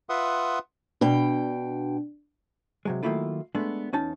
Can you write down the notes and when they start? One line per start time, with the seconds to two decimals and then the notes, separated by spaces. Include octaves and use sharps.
0.09 F4 B4 E5 F#5 C6 D#6
1.01 B2 D4 G5
2.85 C3 F#3 G#3
3.03 D#3 F#3 A3 A#3 E4 F4
3.55 G#3 A3 B3 D4
3.93 E2 C#4 D#4 A5